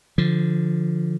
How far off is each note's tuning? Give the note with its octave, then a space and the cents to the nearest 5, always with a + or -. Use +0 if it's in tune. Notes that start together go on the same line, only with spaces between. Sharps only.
D3 +0 F3 -10